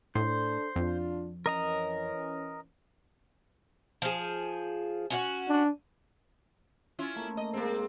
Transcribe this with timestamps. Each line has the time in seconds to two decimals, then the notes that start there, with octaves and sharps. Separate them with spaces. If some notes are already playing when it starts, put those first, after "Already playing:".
0.15 A2 D4 A4 C5
0.76 F2 D4 F4
1.46 E3 C#4 A#4 D#5 A#5
4.02 F3 G#4
5.10 C#4 F4 F#4
5.48 D4
6.99 C#4 E4 F4
7.16 A3 A#3
7.37 D#5
7.53 G#2 A#3 C4